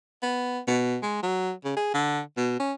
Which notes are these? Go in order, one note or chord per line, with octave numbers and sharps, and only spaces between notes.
B3
B2
G#3
F#3
C#3
G#4
D3
B2
C#4